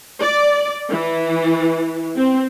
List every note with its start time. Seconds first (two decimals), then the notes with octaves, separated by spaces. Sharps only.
0.19 D5
0.91 E3
2.17 C4